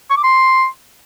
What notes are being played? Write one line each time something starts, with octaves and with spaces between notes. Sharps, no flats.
C#6
D6
C6